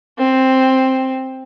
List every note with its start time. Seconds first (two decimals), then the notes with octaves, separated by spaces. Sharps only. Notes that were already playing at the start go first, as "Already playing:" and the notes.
0.18 C4